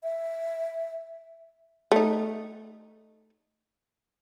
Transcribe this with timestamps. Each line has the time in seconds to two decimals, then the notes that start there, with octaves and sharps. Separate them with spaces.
0.03 E5
1.92 A3 D#4